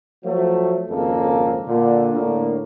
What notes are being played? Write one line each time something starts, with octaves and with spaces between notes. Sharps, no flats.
F3 F#3 A3
G#1 F2 C#3 G#3 A#3 A4
A#2 D3
A2 D3 A#3